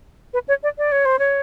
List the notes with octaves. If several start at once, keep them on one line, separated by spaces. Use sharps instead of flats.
B4
C#5
D5
D5
C#5
C5
C#5